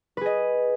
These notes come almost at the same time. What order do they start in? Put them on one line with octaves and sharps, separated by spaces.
B4 G#4 D#5